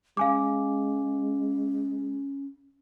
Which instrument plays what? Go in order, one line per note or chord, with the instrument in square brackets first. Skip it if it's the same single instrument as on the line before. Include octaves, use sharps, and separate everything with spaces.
[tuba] G#3 [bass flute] C#4 [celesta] F5 G#5 D6